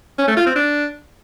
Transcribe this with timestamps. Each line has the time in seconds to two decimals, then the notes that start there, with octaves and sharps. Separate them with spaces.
0.19 C#4
0.28 A3
0.37 F4
0.46 C4
0.55 D4